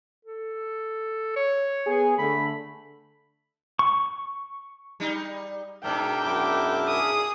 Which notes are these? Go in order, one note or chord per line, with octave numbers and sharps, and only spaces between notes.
A4
C#5
B3 G#4
D3 A3 B5
C#6
G3 D#4
G#2 B2 D4 A#4 E5 G5
F#2 E4 D6
G#4 D#6